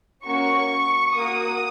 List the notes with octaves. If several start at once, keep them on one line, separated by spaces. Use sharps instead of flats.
A#3 C#4 F#4 C#6
A#3 F#4 D#6